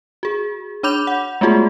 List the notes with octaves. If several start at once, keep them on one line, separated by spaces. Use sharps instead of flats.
F#4 G#4
D4 C#5 B5 D6 G6 F7
F#5
G#3 A3 B3 F4 F#4 G#4